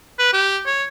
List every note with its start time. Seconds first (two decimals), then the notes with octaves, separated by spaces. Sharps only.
0.19 B4
0.33 G4
0.66 C#5